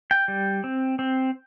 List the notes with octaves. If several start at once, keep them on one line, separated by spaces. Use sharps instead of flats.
G5
G3
C4
C4